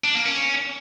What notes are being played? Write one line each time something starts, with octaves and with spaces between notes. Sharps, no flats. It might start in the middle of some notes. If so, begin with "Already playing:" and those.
D4
A#3
C#4